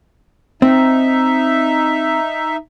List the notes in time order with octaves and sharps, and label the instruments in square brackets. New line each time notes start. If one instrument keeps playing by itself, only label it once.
[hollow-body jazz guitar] C4 [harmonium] D#4 E5